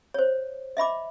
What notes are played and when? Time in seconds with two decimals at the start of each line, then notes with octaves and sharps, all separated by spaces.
0.14 C5 C#5
0.77 D#5 E5 B5 D6